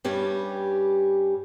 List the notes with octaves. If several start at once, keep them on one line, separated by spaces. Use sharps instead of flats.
G2 G3 C#4 G4